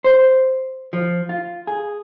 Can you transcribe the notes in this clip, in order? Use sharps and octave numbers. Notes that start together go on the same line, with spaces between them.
C5
F3
F4
G#4